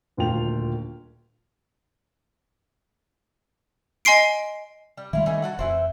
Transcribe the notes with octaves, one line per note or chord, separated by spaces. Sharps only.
D#1 D2 A#2 F4 G5 F7
D#5 G#5 C6 C7 D7
G3
D#3 F#3 G3 E4 F4
E3 A3 D#4
D4 F#4 F#5
F1 E3 E4 C5